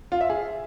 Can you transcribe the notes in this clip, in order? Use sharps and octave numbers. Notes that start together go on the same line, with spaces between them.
F4
E5
G#4